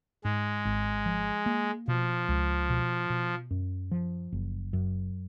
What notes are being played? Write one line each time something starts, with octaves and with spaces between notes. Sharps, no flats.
G#2 G#3
G#1
F3
A#3
B2 F3
C#2
B2
B2
F#2
F3
F#1
F#2